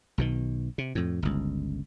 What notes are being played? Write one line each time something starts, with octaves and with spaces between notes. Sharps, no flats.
B1 B2 D#3
C3
F2 A2
G1 C#2